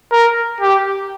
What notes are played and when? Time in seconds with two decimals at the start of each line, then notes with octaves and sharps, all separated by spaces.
0.12 A#4
0.61 G4